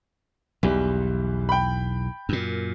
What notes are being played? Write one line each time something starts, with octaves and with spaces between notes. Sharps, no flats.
B1 E2 E3 G3
G5 B5
F#2 A#2